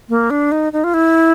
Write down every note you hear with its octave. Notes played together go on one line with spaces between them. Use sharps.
A#3
D4
D#4
D#4
F4
E4